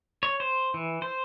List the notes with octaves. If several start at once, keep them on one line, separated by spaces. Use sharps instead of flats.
C#5
C5
E3
C5